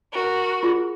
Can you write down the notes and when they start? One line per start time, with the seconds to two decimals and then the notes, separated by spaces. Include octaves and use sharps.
0.12 F#4 A#4
0.63 F4 G#4